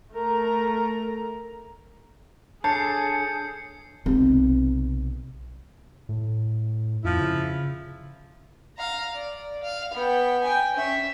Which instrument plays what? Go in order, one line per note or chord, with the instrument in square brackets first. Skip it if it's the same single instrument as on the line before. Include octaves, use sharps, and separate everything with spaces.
[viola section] A3 A#4 A#5
[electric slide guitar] D4 A4 C#5 [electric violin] G#4 [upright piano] A5 [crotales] G6 C7 C#7
[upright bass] B1 C3
[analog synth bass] A2
[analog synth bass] F2 [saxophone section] F3 E4
[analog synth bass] C#3
[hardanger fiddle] F5 A#5
D5
F5
B3 G5
G5 G#5
C#4 E5